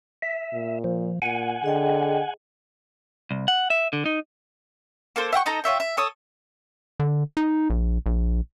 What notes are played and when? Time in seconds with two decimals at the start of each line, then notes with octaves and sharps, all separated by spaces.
0.22 E5
0.53 A#2
0.84 F3
1.22 A#2 F#5 G#5
1.64 D3 G#4 D#5 G5
3.31 C2
3.48 F#5
3.70 E5
3.93 D3
4.06 D#4
5.16 A#3 A4 C5
5.33 E5 F#5 G5 C#6
5.46 D#4 A4 D#5 A#5
5.64 F4 C#5 E5 G5
5.80 E5
5.97 A4 C#5 D#6
7.00 D3
7.37 D#4
7.70 A#1
8.06 A#1